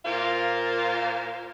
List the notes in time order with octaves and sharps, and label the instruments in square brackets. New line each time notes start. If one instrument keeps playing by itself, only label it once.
[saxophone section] A#2 F4 A#4 C5 F5